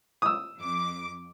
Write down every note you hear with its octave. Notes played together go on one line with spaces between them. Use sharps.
D#6 E6
F2 D6